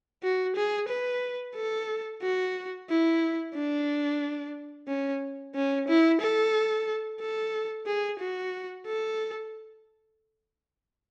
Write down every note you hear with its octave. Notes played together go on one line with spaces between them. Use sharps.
F#4
G#4
B4
A4
F#4
E4
D4
C#4
C#4
E4
A4
A4
G#4
F#4
A4